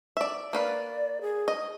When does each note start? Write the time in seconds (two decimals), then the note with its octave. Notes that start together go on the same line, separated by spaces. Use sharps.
0.17 D5 E5
0.53 A#3 B4 D5 F5
1.21 G#4
1.48 D#5